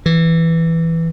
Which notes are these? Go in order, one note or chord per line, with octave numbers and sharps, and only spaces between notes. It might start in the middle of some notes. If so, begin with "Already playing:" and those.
E3